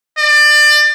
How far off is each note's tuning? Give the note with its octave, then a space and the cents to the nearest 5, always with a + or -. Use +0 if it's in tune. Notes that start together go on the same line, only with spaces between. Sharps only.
D5 +25